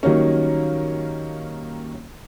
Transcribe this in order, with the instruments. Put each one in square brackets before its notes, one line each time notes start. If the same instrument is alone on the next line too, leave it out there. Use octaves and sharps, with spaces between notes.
[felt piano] D#3 F#3 G3 A#3 C#4